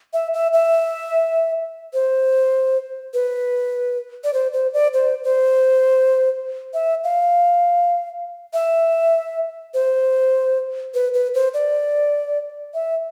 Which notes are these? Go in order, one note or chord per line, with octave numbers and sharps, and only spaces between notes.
E5
E5
E5
C5
B4
D5
C5
C5
D5
C5
C5
E5
F5
E5
C5
B4
B4
C5
D5
E5